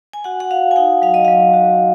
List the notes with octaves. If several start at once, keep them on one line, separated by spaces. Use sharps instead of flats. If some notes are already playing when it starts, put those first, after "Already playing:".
G#5
F#4 F#5
F#5
F#4 F5
G#5
D#4 F#5
F#3 F5
D#5
F#3 F5
F#4